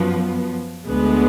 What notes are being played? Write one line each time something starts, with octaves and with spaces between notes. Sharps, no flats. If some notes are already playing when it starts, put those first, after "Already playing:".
Already playing: F#2 F3 B3
D2 D3 G#3 B3